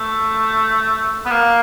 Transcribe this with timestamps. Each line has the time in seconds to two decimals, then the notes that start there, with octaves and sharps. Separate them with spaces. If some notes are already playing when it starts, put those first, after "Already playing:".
Already playing: A3
1.26 B3
1.31 A#3